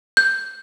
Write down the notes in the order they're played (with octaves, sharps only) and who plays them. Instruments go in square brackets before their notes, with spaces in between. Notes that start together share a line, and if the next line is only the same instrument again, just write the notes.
[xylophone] G6